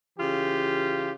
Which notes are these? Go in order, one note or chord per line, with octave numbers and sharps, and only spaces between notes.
C#3 E3 F4 G4